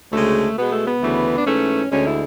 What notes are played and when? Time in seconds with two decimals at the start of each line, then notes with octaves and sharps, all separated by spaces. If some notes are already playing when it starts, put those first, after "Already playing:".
0.12 D2 C#3 G#3 A3
0.57 B2 G#3 B3
0.71 A3
0.87 B3
1.02 D2 C#3 E3 A3
1.37 D4
1.46 G#2 E3 A3 C#4
1.91 D2 D3 G#3 C#4
2.06 E4